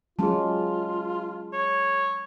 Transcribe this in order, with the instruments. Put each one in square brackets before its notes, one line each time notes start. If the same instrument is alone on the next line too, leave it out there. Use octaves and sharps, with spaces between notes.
[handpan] F#3 G#3 C#4 [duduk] F4 [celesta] G#4 A5
[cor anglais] C#5